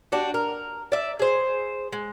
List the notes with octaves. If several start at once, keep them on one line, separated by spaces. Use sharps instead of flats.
G3 D4 F#4
A#4
D5 E5
G#4 C5
G#3